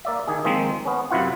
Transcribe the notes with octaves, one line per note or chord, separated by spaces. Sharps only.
A#3 D5 E5
D#3 G#4
D#3 F3 G#3 A#3 C4
B3 C#4
F#2 C3 E4 F4 F#5